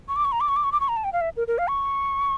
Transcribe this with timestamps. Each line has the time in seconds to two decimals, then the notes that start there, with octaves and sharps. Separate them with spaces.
0.08 C#6
0.16 D6
0.25 C#6
0.32 A#5
0.41 D6
0.49 C#6
0.56 D6
0.64 C#6
0.72 D6
0.80 C#6
0.89 A#5
0.97 A5
1.04 G5
1.13 F5
1.21 E5
1.37 A#4
1.48 A#4
1.58 F5
1.69 C#6